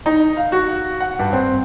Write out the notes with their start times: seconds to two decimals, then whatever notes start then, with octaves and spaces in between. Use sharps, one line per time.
0.06 D#4
0.37 F5
0.52 F#4
1.00 F#5
1.19 G2
1.33 C4